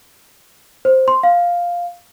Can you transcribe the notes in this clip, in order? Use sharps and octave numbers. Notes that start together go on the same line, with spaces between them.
C5
C6
F5